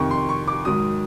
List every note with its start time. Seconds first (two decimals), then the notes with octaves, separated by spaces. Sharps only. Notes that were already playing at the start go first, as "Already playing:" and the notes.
Already playing: F2 C3 D#3 C#6
0.11 C6
0.29 C#6
0.48 D6
0.65 G#2 D#3 F#3 D#6